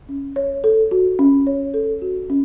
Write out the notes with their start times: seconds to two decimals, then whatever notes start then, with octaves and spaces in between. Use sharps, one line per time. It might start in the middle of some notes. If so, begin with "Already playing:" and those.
0.09 C#4
0.36 C#5
0.64 A4
0.91 F#4
1.19 C#4
1.47 C#5
1.74 A4
2.02 F#4
2.30 C#4